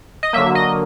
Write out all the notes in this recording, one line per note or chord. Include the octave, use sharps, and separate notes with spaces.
D#5
D3 F#3 A#3 E5
D#5